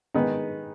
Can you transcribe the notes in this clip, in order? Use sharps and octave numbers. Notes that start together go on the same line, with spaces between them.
D#3 G#3 B3 D#4